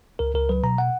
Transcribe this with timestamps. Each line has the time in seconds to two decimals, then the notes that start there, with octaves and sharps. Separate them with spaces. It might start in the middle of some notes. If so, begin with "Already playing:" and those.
0.19 C#2 A#4
0.34 C#2 A#4
0.49 F#3 B4
0.63 B2 A#5
0.78 F#5